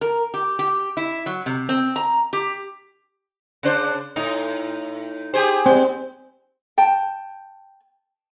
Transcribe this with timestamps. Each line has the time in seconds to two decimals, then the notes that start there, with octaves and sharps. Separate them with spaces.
0.01 A#4
0.34 G4
0.59 G4
0.97 E4
1.26 F#3
1.46 C3
1.69 C4
1.96 A#5
2.33 G4
3.63 C#3 D4 C5
4.16 A2 D#4
5.34 G4 G#4 C5
5.66 G3 C4
6.78 G5 A5